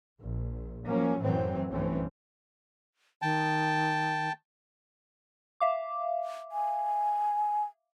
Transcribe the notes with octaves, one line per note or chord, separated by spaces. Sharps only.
A#1
F3 F#3 A#3 C#4
F#2 A2 E3 F#3 C4
B1 G2 E3 A3 C4 C#4
D#3 G5 A5
E5 F5 D6
G#5